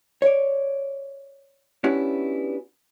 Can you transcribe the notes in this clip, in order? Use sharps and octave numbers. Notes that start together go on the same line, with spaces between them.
C#5 D5
B3 C#4 D4 E4 F#4 G4